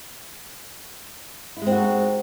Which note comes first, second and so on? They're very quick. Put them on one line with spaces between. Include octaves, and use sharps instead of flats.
E4 G#3 C4 F#4 D#4